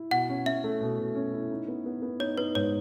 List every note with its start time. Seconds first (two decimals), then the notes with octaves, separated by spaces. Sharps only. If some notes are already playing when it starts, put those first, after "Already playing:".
Already playing: E4
0.11 B2 F#5
0.29 C#4
0.46 C#4 E5
0.64 A3
0.81 B2
0.98 B2
1.15 C#4
1.33 E4
1.51 D#4
1.68 B3
1.86 B3
2.02 B3
2.20 D#4 C#5
2.37 D#4 B4
2.55 G#2 C#5